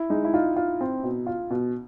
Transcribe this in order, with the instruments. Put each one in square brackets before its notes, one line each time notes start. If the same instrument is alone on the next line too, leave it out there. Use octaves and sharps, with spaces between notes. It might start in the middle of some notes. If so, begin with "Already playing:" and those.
Already playing: [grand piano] E4
[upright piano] G#3 [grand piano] D#4
[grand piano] E4
[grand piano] D#4 [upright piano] F4
[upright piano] F4
C4
B2
F4
B2